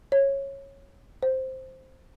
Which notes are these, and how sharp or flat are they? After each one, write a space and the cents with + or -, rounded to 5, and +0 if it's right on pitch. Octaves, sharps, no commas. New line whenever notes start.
C#5 -15
C5 +0